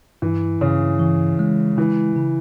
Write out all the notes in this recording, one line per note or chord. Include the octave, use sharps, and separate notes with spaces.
G2 E3
G2 C#3
E3
G#3
C#3 E3
C#3